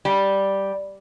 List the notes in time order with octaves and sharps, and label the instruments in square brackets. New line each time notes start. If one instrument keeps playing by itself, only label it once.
[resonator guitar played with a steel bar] G3